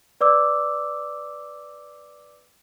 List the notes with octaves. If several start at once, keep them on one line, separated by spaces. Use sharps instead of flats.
B4 D5 D6 E6